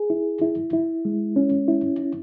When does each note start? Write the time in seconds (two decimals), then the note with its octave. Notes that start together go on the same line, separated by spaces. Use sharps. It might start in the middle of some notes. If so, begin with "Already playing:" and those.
Already playing: G#4
0.10 E4
0.42 E4
0.73 E4
1.05 G#3
1.36 C#4
1.68 E4
1.99 E4